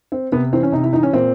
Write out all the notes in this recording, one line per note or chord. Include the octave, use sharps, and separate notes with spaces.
C4
C3 B3
E3 C4
C#4
C3 D#4
E4
E3 D#4
C#4
A#2 C4